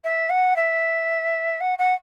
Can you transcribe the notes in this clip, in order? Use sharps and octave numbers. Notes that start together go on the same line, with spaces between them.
E5
F#5
E5
F#5
F#5